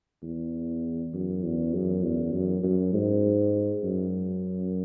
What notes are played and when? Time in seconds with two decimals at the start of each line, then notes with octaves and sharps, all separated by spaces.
0.23 E2
1.14 F#2
1.43 E2
1.74 F#2
2.04 E2
2.33 F#2
2.63 F#2
2.94 G#2
3.84 F#2